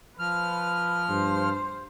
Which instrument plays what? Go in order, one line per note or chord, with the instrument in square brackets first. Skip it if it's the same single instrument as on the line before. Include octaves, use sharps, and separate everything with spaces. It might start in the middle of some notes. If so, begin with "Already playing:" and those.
[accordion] F3 F6 [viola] B4
[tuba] G2 [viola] C5